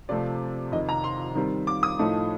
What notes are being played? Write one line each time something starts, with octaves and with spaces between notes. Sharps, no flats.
C3 F3 A3 C4 D5
F2 C3 D#3 D#5
A#5
C6
D#3 G3 C4
D6
D#6
A2 F3 A3 D#4